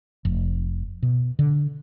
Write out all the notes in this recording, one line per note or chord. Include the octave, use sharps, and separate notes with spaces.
F1
B2
D3